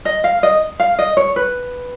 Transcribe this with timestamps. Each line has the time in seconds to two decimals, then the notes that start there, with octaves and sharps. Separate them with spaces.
0.05 D#5
0.24 F5
0.43 D#5
0.80 F5
0.99 D#5
1.17 C#5
1.36 B4